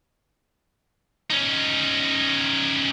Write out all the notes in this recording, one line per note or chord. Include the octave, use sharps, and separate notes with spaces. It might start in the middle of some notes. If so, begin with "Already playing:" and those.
C#4 D#4